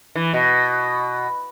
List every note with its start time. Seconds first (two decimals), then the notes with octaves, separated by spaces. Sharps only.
0.15 E3
0.34 B2